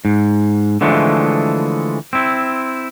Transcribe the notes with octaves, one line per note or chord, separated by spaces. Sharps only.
G#2
D3 E3 F3 G#3 A3
C4 E4